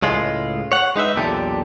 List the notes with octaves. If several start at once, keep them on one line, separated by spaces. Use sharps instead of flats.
C#2 A2 G#3 F4
C#5 F#5
G#3 D#4 B4 E5
B1 E2 A#2 D3 G4 A4